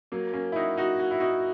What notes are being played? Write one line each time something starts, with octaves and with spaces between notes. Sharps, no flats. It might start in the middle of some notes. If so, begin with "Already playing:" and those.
F#3 A#3
A#3 C#4
E4
D#4 F#4
D#4 F#4
F#4
E4
D#4 F#4